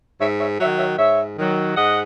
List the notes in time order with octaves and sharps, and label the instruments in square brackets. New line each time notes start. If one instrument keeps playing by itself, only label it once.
[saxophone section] G#2 C#5 E5
C#5 E5
F#3 C#5 E5
D#3
C#5 E5
G#2 C#5 E5
D#3 F#3
G#2 D#5 F#5